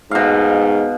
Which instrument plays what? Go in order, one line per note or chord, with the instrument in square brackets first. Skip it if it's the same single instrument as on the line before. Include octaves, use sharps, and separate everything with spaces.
[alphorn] G#2 [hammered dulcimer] B2 F5